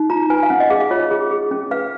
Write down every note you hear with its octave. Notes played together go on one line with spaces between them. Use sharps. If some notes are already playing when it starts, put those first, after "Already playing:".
Already playing: D#4
F4 A#5
B4 G#5
F5
C#4 F#5
D#5
G#4 F5
F5
F4 C#5
G#4
G#4
C#4
B4 F5